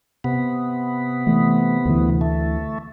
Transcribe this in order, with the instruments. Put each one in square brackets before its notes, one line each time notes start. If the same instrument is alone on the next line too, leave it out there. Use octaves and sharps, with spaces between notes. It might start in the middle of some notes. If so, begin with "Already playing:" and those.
[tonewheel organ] C3 B3
[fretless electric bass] E3 A3
D2 E3
[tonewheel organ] A3